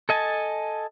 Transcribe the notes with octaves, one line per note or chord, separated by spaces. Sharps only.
A4 D#5 G#5 A5